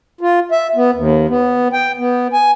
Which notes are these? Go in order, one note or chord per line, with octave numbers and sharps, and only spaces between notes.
F4
E5
B3
D#2
B3
G5
B3
G#5